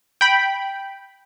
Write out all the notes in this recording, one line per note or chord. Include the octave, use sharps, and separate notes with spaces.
G5 B5